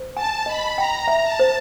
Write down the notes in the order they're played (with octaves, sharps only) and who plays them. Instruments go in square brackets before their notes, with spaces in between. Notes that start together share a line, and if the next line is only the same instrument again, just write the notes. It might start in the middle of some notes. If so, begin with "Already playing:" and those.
Already playing: [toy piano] C5
[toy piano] G#5 [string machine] A5
[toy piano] D#5 [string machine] B5
[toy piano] G5 [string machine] A#5
[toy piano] E5
[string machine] A5
[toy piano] C5